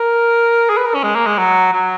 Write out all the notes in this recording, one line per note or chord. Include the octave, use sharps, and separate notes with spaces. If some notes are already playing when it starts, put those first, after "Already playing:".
Already playing: A#4
G#4
B4
A#4
C#4
G#3
A#3
G#3
F#3
F#3